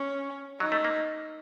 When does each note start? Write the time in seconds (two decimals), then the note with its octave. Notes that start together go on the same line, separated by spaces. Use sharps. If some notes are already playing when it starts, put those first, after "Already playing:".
Already playing: C#4
0.60 F#3 D#4
0.72 A3
0.84 A#3